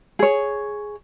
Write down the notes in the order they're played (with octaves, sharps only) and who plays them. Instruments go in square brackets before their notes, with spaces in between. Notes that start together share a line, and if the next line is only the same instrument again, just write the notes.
[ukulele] G#4 C#5